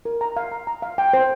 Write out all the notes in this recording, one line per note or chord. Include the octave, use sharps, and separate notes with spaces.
A#4
A#5
F5
A#5
A#5
F5
G5
C5